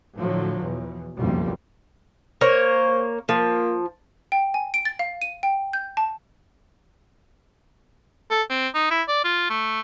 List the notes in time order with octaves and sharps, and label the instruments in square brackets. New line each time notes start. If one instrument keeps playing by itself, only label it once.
[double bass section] A2 D3 F3 F#3
E2 B2
F#1 B1 F2 F3 G3 A#3
[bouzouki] A#3 C#5 [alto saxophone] C5
[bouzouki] F3 [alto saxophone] A#3
[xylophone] G5
G#5
D7
A6
F5
D#7
G5
G6
A5
[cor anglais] A4
C4
D#4
E4
D5
F4
A3